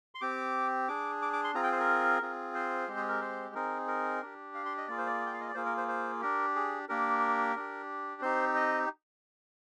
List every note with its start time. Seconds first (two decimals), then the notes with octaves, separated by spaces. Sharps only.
0.15 C6
0.21 C4 G4 D6
0.88 D4 G#4 D6
1.22 D6
1.33 D6
1.44 C6
1.54 C4 F4 G#4 A#5
1.64 G5
1.72 C5
1.80 A#4
2.22 C4 F4 G#4
2.55 C5
2.88 G#3 C4 G4
2.97 G#4
3.08 A#4
3.21 C5
3.55 C4 D#4 G#4 A#4
3.88 A#4
4.22 D4 G4
4.55 F5
4.66 C6
4.77 D#5
4.88 A#3 F4 G#4 D5
4.98 C5
5.06 D5
5.26 G5
5.33 F5
5.40 D#5
5.48 D5
5.55 A#3 F4 G#4 C5
5.66 A#4
5.77 C5
5.88 C5
6.21 D4 G4 A#4
6.56 G#4
6.89 A#3 D4 G4 A#4
7.56 D4 G4
8.21 C4 D#4 G4 C5
8.56 D#5